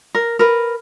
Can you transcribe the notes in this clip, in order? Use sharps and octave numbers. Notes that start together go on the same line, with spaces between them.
A#4
A#4 B4